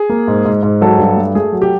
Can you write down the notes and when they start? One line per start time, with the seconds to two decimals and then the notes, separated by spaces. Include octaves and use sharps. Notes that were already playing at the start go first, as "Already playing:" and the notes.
Already playing: G#4
0.10 A#3
0.28 G#2
0.45 G#2
0.63 G#2
0.81 F#3 A4
0.99 G2
1.17 A3
1.35 A3 G#4
1.52 F#3
1.62 G4